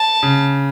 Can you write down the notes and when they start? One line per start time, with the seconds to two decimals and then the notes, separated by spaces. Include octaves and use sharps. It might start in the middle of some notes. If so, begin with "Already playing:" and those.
Already playing: A5
0.23 C#3